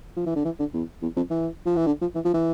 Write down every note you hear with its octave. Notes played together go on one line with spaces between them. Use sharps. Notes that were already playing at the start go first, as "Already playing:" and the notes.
F3
E3
D3
E3
D3
E2
E2
F2
E3
F3
E3
D3
F3
E3
F3
E3